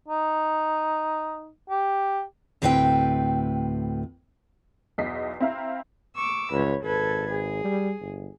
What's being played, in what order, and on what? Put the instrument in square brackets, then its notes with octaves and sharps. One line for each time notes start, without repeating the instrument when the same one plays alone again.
[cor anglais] D#4
G4
[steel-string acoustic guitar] D2 A2 C4 B4 F5 G5
[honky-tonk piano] B1 E2 D#5 B6 C7
C4 E4 E5 F5 A#5
[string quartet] C#6 D6 E6
[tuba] C#2 [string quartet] B4 C#5
[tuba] G#1 [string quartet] A4 B4 G#6
[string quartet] G#4
[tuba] G3
G1